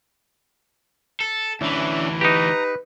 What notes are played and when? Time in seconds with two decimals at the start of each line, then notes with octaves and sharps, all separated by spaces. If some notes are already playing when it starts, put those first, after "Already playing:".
1.20 A4
1.61 D2 E3 C#4 D4 E4
2.21 D#4 G4 B4 A#5